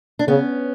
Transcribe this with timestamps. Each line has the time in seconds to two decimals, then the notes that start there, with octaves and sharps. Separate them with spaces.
0.19 D4
0.27 C#3 B3 C#4